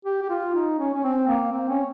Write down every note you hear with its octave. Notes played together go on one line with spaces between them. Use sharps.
G4
G4
F4
D#4
C#4
C#4
C4
A#3
C4
C#4